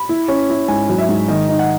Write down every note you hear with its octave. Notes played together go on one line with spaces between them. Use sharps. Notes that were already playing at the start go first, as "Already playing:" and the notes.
Already playing: B5
E4
C#4
E4
G#2 G#5
F#3
E5
G#2
D#3 D#5
D#4
F#5